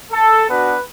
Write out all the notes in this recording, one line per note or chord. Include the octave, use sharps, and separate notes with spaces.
A4
B3 D4 F#4 B4